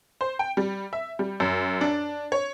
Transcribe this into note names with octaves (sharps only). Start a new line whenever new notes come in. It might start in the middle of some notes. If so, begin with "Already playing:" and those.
C5
G5
G3
E5
G3
F#2
D4
C#5